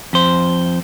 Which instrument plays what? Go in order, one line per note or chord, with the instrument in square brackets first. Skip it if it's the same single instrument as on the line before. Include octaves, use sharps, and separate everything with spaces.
[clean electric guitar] F2 C5